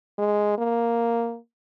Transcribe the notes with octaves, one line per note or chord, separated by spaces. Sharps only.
G#3
A#3